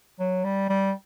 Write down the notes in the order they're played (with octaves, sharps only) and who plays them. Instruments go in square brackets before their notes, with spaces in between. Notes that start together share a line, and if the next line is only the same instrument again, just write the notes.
[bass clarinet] F#3
G3
G3